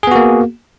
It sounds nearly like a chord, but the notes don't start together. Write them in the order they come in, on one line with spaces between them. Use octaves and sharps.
G#4 B3 F#4 A#3